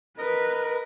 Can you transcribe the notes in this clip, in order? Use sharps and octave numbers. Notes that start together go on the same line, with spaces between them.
A#4 B4 D#5